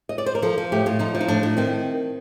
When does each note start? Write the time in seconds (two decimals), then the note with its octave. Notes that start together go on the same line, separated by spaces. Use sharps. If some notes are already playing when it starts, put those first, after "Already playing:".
0.09 D#5
0.18 D5
0.26 C5
0.35 A#4
0.42 F3 A4
0.58 F3
0.72 A2 G4
0.86 A2 F4
0.99 F3 D#4
1.15 F3
1.21 D#4
1.28 A2 D4
1.43 A2
1.57 D#3 C4